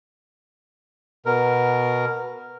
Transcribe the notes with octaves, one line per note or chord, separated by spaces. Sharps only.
B2 A#4